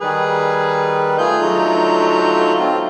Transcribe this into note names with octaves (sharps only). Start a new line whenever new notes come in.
D#3 G3 G#4 B4
A3 F4 G#4 G6
D3 F#3 D#4
A3 C4 F4